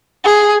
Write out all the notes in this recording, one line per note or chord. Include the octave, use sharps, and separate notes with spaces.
G#4